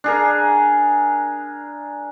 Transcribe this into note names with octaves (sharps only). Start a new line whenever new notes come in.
D4 G#4 A#4